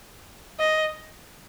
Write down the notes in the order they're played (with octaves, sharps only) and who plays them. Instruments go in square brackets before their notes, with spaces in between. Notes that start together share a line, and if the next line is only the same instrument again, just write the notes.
[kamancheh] D#5